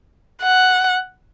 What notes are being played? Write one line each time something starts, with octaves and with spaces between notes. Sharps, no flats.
F#5